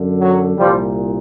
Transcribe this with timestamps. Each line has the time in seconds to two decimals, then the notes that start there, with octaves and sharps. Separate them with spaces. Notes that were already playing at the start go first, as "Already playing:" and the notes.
Already playing: F#2 D3
0.20 F#3
0.58 C2 A#2 F3 G3